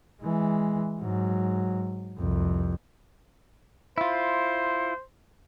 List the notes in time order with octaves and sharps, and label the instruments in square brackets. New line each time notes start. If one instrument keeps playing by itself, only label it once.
[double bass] E3 G#3
G#2 F#3
C2 F2
[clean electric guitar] E4 F4 [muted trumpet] C5